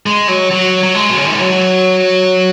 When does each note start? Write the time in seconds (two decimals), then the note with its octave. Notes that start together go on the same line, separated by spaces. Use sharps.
0.06 G#3
0.28 F#3
0.51 F#3
0.83 F#3
0.95 G#3
1.09 B2
1.17 C#3
1.24 D#3
1.32 E3
1.39 F#3